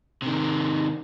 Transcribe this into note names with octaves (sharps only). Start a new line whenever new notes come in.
C3 D#3